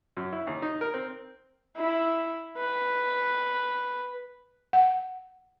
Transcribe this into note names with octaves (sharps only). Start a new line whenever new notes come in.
F#2
E4
D#2
D#4
A#4
C4
E4
B4
F#5